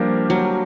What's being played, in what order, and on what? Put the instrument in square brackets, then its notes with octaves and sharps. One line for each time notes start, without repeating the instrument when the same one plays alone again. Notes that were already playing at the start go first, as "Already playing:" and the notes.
Already playing: [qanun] F3 [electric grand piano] G3 A#3 D4 G4 A#4
[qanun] F#3